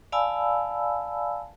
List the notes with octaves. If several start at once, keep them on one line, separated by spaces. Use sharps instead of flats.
D5 F5 G#5 A5 B5 E6